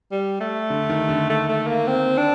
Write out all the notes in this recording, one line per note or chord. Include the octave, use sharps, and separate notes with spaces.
G3
A3
D3
D#3
D3
A3
A3
A#3
C4
D4